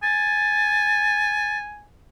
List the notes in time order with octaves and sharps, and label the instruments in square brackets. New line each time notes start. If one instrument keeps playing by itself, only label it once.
[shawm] G#5 [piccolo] A6